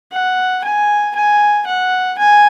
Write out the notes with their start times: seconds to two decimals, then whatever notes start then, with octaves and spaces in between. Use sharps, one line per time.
0.12 F#5
0.64 G#5
1.15 G#5
1.67 F#5
2.19 G#5